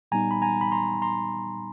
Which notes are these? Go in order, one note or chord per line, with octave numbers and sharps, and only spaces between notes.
A#2 G3 B3 D#4 G#5 A#5
B5
G#5 A#5
B5
A#5 C6
A#5 C6